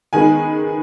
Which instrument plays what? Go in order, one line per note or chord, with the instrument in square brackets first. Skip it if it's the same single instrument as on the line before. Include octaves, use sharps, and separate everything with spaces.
[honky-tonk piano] D#3 G#3 B3 [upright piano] G#5